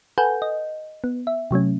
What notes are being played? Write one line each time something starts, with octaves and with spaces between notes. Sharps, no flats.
A4 B4 F#5 G#5 G6
D#5
B3
E5
C3 F#3 A3 C#4